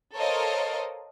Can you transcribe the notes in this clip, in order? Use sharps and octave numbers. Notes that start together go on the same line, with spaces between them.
A4 A#4 C5 C#5 D#5 F5